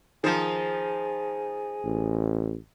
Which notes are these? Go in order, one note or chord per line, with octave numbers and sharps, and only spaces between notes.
D#3 F3 D#4 G#4 C5
A1